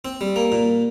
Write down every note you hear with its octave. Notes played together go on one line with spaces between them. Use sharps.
C4
G3
A#3
A#2